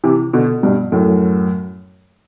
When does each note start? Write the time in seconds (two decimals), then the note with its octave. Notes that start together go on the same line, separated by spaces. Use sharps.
0.04 C3 E3
0.33 B2 D3
0.63 G2 B2
0.92 F#2 A2